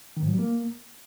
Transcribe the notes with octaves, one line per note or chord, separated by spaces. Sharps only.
D#3
G#2
F#3
G3
A#3